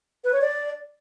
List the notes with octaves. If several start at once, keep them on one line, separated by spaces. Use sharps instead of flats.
B4
C#5
D5